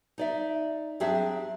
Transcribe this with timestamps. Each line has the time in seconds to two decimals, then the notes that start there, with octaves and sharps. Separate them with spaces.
0.18 D#4 D5 E5
1.00 F#3 C4 D4 G4 G#4 E5